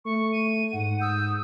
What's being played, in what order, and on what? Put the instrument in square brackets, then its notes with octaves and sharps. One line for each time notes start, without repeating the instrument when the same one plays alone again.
[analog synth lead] A3 [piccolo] C#6
[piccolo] D#7
[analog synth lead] G#2 [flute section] F#5
[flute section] D#6 G6 [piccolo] E6